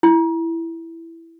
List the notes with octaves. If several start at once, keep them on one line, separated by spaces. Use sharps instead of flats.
E4